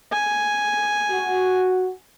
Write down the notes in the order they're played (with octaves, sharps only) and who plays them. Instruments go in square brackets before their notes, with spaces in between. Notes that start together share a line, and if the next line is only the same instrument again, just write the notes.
[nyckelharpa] G#5
[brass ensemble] F#4